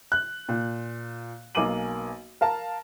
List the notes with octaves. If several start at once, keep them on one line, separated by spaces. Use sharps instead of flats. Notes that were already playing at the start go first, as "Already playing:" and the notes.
F#6
A#2
B1 A#3 G#5 D6 D#7 F#7
A#4 F5 A5